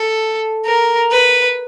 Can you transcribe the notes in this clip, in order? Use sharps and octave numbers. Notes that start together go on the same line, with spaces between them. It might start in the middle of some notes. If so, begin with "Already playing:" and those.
Already playing: A4
A#4
B4